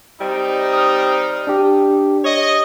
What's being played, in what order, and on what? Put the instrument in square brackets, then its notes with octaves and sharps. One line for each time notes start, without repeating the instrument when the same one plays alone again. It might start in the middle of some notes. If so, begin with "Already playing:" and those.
[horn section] G3 C4 D#4
[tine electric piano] D#6 F6
D4 G4
[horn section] C#5 D#5